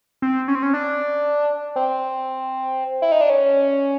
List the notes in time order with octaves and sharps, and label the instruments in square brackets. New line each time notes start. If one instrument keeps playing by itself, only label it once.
[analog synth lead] C4
C#4
C4
C#4
D4
C4
E4
D#4
D4
C#4